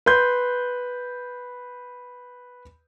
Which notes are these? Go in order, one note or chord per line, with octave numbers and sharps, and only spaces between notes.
B4 C6 G6